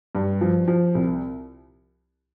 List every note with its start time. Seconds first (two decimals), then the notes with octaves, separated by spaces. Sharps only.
0.15 G2
0.41 F3
0.68 F3
0.95 C2